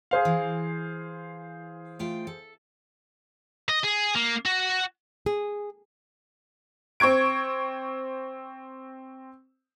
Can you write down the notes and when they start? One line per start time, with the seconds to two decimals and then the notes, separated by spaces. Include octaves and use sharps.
0.11 G#4 C5 F5
0.25 E3
1.99 A3 F4 G5
2.27 A4
3.69 D#5
3.84 G#4
4.15 A#3
4.45 F#4
5.26 G#4
7.00 C4 C#6 G#6 D7